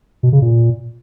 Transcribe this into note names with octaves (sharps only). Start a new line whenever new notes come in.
B2
C#3
A#2